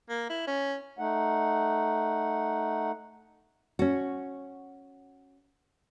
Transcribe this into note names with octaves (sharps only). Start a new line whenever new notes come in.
A#3
E4
C#4
A3 D#4 F#5
C#4 F#4